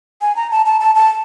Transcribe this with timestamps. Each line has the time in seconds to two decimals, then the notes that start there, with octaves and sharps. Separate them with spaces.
0.22 G#5
0.36 A#5
0.51 A5
0.66 A5
0.81 A5
0.95 A5